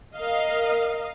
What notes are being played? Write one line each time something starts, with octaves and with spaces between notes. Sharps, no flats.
A#4 D#5 F5